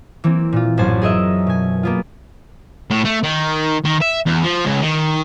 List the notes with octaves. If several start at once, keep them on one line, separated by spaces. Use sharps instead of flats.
E3 A#3 C4
A#2 F4
A1 F#2 C5 G#5 A6
G#4 A#4 D#5 E5
B2 G#5
A#3 B3 F4
A2
A3
D#3
D#3
E5
E2
F3
C#2
D#3